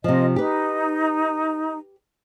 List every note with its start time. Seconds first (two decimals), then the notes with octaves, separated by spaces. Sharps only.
0.04 C3 F3 F4 D#5
0.36 D#4 G4 B4